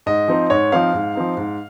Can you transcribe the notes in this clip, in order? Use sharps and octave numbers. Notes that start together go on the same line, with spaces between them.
G#2 D#5
F3 C4 D#4
G#2 C#5
F3 C4 D#4 F5
G#2
F3 C4 D#4
G#2